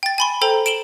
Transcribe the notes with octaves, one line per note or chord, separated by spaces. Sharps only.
G5 A6
G#5 B5 C6
A4 C5 G5 A#5
D7 E7 F#7 G7